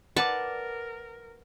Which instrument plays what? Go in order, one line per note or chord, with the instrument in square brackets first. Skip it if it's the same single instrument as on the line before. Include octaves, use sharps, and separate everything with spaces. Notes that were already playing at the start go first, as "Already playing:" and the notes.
[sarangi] A#4 [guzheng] B4 D5 [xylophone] F#5 D6 [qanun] A5